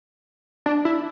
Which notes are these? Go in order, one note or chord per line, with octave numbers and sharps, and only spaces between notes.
D4
E4